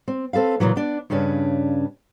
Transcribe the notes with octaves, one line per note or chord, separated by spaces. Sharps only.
C4
C4 A4 B4 F5
A#2 C#3 E3 F#3
B3 D4
G2 C#3 C#4 D4 B4